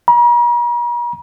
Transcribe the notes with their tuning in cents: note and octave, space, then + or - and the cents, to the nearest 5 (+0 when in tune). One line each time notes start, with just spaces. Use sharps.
A#5 +45